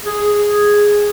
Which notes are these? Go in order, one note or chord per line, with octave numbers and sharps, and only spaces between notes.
G#4